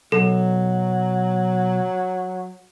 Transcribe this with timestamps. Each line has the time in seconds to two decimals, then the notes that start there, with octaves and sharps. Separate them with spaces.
0.12 B1 F#3 A4